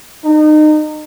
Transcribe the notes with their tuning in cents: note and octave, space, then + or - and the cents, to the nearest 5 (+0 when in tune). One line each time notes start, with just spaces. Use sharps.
D#4 -30